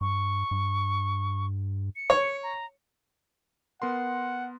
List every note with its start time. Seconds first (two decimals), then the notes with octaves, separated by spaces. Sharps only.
0.01 G2 C#6
0.51 G2
1.96 C#7
2.10 C#5
2.43 A#5
3.82 B3 A#4 F#5 C6